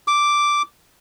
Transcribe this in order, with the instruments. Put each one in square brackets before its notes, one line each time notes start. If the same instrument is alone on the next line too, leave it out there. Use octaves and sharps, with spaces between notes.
[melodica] D6